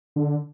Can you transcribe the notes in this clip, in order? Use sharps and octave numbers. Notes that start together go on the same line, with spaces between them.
D3